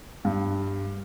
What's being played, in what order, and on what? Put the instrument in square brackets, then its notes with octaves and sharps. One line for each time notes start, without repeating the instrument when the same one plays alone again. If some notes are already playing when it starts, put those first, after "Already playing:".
[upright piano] G2